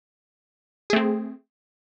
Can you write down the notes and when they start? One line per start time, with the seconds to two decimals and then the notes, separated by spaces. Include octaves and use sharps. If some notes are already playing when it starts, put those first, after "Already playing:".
0.90 G#4
0.93 A3
0.96 C4